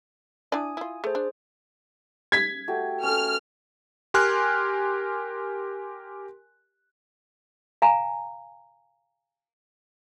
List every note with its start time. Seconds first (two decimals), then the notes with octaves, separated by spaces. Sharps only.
0.52 D4 E4 D5 G#5 D#6
0.77 E4 F4
1.04 A3 G#4 C5
1.15 D4 C5
2.32 G#6 B6
2.68 A3 F#4 G4
3.03 C#4 A4 F6
4.14 G4 A#4 G#5 C6 F6 F#6
7.82 F5 G#5 A#5